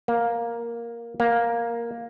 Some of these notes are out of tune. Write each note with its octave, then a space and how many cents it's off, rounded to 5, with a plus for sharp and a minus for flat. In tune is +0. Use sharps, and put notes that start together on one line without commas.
A#3 +5
A#3 +5